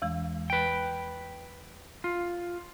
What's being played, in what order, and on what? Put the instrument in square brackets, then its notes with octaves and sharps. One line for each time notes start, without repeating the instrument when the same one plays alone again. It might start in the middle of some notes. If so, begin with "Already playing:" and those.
[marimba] E2 E3 G#3
[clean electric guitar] B4 G5
F4